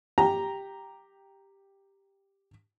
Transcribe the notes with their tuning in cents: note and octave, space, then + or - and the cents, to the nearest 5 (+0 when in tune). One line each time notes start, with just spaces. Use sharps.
G4 +5 G5 +0 A#5 +0